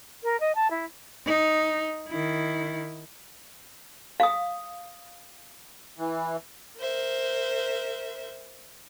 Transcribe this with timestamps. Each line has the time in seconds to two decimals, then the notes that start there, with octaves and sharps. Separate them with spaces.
0.23 A#4
0.40 D#5
0.55 A5
0.70 E4
1.26 D#4
2.08 D#3 E4
4.20 F5 D#6
5.98 E3
6.79 A#4 C5 E5